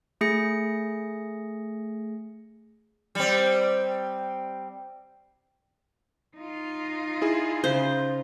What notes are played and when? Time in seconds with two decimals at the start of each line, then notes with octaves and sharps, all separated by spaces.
0.21 A3 G#4 A#6 C#7
3.15 G3 C4
6.36 D#4 F4
7.22 E4 G#4
7.64 C#3 C5